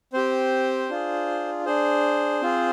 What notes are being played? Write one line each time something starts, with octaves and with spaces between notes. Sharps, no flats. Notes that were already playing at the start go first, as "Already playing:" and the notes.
C4 G4 C5
D4 F4 G#4
D4 G#4 C5
C4 F4 G#4